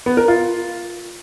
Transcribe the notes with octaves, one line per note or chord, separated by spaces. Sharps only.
B3
A#4
F4